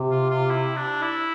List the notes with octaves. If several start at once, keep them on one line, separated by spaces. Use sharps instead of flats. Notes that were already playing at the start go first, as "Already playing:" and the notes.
Already playing: C3
F4
F4
E4
D4
E4